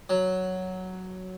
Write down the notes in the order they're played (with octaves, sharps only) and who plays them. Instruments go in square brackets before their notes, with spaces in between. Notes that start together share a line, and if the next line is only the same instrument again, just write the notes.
[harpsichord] F#3